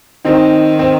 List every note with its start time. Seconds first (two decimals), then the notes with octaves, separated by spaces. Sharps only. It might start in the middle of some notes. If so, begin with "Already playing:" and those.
0.25 D#3 C4 D#4
0.79 C4